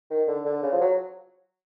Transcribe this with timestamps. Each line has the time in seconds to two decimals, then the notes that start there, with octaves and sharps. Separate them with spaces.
0.10 D#3
0.28 D3
0.45 D3
0.63 C#3
0.73 F3
0.81 F#3